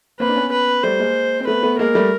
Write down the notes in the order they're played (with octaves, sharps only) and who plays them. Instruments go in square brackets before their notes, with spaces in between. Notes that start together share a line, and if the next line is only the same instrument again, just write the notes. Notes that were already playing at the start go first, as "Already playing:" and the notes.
[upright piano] A#3 C4 [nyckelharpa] B4
[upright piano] D4
B3 C#4
[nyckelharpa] B4
[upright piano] G3 A3 [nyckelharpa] C5
[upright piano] G#3 A#3
C4
[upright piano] A3 B3 [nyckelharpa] B4
[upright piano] A3 B3
[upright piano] G#3 A#3 [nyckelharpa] A#4
[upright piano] G3 A3